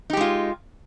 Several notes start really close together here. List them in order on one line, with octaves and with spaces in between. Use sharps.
D#4 G4 G#3 F4